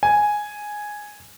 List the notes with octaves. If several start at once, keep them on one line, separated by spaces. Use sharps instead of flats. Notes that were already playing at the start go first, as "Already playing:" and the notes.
G#5